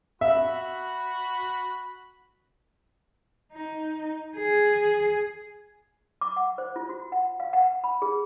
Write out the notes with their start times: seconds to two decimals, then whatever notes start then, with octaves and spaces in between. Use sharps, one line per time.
0.21 F#4 E5 B5
3.53 D#4
4.36 G#4
6.21 D6
6.36 F#5
6.58 C5
6.76 F4
6.89 F#4
7.12 F#5
7.40 F5
7.53 F#5
7.84 B5
8.02 G#4